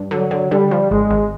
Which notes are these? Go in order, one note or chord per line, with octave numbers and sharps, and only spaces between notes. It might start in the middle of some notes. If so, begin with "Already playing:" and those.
Already playing: G2
D3 F#3
D3
D3 G3
F3
G#1 G#3
G#1